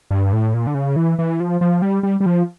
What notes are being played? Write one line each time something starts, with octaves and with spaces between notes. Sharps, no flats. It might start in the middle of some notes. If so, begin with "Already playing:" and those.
G2
A2
A#2
D3
C#3
E3
E3
F3
F3
G3
G3
G3
F3